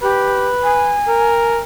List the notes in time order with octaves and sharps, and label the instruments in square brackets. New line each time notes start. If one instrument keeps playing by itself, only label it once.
[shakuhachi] G4 [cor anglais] B4
[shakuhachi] G#5
[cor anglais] A#4